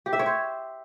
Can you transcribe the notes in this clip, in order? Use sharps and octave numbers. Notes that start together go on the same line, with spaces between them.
G4
E5
C#5
C5